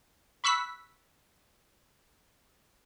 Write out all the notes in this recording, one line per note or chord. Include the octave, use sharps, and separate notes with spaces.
B5 C#6 E6 F#6 B6